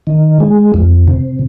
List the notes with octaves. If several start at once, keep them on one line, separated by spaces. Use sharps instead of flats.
D#3
G#3
F2
C3